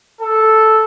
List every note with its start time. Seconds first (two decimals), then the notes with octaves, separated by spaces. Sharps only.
0.21 A4